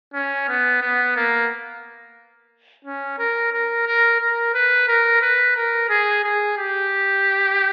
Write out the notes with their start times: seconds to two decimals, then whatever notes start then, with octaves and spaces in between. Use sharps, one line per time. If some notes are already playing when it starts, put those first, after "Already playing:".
0.14 C#4
0.48 B3
0.82 B3
1.16 A#3
2.85 C#4
3.19 A#4
3.53 A#4
3.87 A#4
4.20 A#4
4.54 B4
4.88 A#4
5.22 B4
5.56 A#4
5.90 G#4
6.24 G#4
6.58 G4